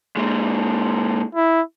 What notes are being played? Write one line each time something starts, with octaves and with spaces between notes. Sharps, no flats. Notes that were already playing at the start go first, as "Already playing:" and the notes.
A#2 G#3
E4